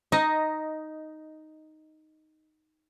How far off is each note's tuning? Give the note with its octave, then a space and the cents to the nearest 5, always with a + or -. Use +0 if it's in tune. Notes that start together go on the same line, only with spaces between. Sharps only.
D#4 +0 D#5 +10